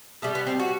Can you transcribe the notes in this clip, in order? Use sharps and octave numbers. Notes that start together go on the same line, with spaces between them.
B2 G3 A3
B3
C4
F#4